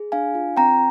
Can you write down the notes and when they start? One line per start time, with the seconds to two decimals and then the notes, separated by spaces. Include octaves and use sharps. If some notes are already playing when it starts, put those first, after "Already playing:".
Already playing: G#4
0.12 D4 F5 G#5
0.35 F4
0.57 C4 G5 A#5